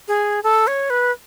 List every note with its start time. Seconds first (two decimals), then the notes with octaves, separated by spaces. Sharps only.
0.08 G#4
0.44 A4
0.67 C#5
0.90 B4